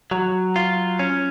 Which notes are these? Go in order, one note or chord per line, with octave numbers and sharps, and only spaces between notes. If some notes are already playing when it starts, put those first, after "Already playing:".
F#3
F4
C#4